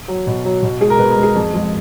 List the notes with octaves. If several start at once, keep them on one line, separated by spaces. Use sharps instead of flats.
F#3
B2
F#3
B2
G#3 G#4
A#4
B2 B4
A#4
G#3
G#4
F2
F3 G#3